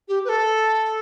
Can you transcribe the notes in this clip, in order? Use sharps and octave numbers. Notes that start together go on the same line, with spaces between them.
G4
B4
A4